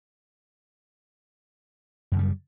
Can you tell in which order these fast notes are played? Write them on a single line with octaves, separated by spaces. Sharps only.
F#2 C#3 G3